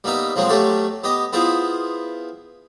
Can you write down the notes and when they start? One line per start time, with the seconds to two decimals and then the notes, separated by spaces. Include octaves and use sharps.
0.04 G3 A#3 B3 D#4 E5
0.36 F3 F#3 G#3 A#3 C4
0.49 F#3 G3 A3 F#4 G4 A4
1.04 B3 G4 D#5
1.33 B3 E4 F4 G#4 C5